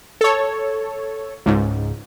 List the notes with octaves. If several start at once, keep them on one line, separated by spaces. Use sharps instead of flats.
A4 C#5
C#2 G#2